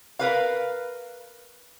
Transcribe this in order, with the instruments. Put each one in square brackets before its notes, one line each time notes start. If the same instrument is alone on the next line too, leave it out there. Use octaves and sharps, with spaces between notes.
[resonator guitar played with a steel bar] A#4 B4 F5